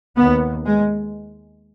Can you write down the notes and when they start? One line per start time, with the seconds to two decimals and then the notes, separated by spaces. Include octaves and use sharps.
0.17 D#2 B3
0.65 G#3